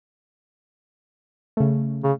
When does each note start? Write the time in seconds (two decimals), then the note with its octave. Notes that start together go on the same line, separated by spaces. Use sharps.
1.57 C#3 A3
2.04 C#3